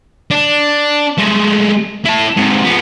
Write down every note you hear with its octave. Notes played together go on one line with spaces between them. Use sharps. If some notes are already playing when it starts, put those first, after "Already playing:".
D4
G#3 A3
E4 A5
G#2 C3
F3 B3